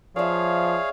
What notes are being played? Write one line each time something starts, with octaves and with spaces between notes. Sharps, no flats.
F3 G#4 C#5 D5 E5 F5